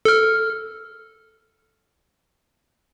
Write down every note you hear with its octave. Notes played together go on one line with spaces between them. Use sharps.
A4 F6